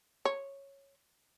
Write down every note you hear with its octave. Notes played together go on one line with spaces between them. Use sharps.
C#5